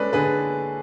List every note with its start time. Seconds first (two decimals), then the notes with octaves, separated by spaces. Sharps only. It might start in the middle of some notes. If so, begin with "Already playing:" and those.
Already playing: G#3 C#4 G#4 A4 B4 D5
0.13 D3 G#4 B4